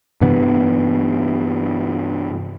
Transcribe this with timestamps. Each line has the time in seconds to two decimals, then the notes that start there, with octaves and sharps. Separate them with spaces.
0.21 G2 C3 E3 B3